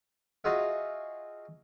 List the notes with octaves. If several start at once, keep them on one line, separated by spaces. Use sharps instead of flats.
D#4 F4 F#4 G#4 E5